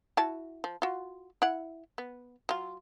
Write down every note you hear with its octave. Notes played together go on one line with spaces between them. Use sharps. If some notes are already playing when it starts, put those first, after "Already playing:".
E4 F#4 A5
F3
F4 F#4
E4 F#5
B3
F#3 F4